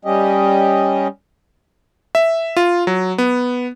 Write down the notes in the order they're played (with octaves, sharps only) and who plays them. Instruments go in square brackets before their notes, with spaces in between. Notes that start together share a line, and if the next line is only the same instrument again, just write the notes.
[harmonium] G3 C#4 G4 D#5
[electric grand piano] E5
F4
F#3
B3